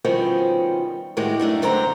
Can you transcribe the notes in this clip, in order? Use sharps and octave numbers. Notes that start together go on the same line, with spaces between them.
B2 D#3 F3 G3 C4 C#4
A2 D#3 G#3 F#4 G4
F#2 A3 D4 D#4
F#2 D3 C4 C5 A#5